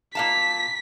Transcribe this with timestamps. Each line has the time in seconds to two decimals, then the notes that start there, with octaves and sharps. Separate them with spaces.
0.15 A#2 F5 A5 B6